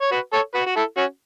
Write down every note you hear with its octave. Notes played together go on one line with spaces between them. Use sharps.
C#5
F#4 B4
A4 C#5
F#4 B4
F#4
E4 A4
C#4 F#4